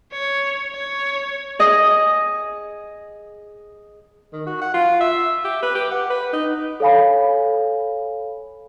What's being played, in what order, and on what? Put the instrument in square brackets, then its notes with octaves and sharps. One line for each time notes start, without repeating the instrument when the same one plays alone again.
[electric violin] C#5
C#5
[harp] G#4 D#5
[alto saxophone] D#3
F#4
F#5
F4
E5
G4
B4
G4
F#5
B4
D#4
[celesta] A4 C#5 F5 G#5 B5